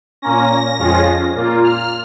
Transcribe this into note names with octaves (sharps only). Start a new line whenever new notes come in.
A#2 A#3 C#4 A#6
F2 F3 G#3 C#4 F4
A#2 A#3 F4
F6